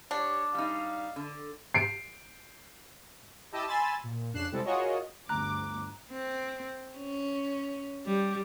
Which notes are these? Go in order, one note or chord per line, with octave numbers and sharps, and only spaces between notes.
D4 G4 C#5
G3 D#4 F5
D3
C7 D7
E4 G4 D#5 A5 E6
G#5 B5 C6 E6 A6
A#2
F2 C#3 D4 F#6 C7 E7
C3 G3 G#3 C4 E4 A4
F4 F#4 G#4 A#4 C#5 D#5
G1 D2 A#5 D6 F#6
C4
C#4
G3